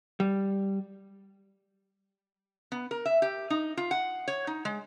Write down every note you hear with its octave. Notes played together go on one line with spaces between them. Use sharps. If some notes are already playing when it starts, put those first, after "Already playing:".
G3
B3
A#4
E5
G4
D#4
F4
F#5
C#5
D#4
G#3